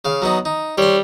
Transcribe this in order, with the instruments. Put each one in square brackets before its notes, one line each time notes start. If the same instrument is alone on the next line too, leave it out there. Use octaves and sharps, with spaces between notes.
[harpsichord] C#3 F5
F#3 B3 D#4
D#4
[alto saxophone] G3 [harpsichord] C#5 C6